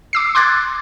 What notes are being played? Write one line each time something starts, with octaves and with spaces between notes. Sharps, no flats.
D6 E6 C7
C6 D6 F#6 G#6 A6